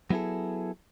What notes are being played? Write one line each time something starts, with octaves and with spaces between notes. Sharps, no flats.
F#3 B3 E4 G#4 A4